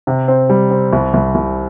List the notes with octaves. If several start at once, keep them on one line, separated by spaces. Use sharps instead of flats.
C3
C4
G3
C4
C2
C2
C2